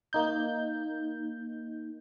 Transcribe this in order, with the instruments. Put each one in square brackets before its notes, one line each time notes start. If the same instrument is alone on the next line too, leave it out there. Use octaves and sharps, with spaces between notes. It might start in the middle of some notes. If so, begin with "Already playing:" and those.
[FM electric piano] A#3 D#4 G6